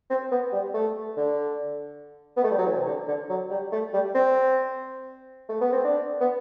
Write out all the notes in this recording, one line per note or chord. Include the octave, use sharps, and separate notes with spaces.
C4
B3
G3
A3
D3
B3
A3
G3
F#3
E3
C3
D3
D3
F#3
G3
A3
G3
C4
A3
B3
C4
D4
B3